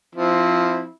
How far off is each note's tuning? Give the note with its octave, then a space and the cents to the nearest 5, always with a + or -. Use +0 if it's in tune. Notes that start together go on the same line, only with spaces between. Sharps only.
F3 +0 C4 -5 E4 -20